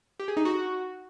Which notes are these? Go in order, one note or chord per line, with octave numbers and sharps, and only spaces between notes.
G4
G#4
D#4
F#4